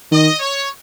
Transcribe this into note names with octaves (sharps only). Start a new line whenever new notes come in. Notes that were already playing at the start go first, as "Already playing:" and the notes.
D#3 D#5
C#5